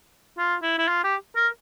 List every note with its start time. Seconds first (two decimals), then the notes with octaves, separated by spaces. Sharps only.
0.38 F4
0.62 E4
0.78 E4
0.88 F4
1.04 G4
1.36 A#4